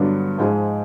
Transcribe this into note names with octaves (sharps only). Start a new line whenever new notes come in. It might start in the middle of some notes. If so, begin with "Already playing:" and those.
Already playing: G2 D3 F#3 B3 D4
G#2 F3 G#3